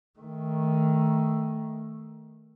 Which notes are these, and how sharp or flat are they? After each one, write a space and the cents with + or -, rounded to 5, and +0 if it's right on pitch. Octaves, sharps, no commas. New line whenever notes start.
D#3 +10 A3 +0